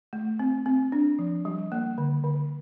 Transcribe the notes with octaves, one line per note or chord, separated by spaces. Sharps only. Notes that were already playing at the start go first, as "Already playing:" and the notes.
A3
C4
C4
D4
F3
G3
A#3
D3
D3